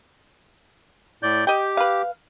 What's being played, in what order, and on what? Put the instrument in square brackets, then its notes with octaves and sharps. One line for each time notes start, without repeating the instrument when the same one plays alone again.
[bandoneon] A2 D5 G6
[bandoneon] G4 [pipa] D#5 G5
[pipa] B4 F5